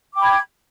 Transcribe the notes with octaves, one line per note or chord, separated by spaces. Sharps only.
G5 B5 D6 G#6